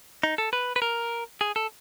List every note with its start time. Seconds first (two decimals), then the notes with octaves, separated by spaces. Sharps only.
0.23 D#4
0.38 A4
0.53 B4
0.76 B4
0.82 A#4
1.41 G#4
1.56 A4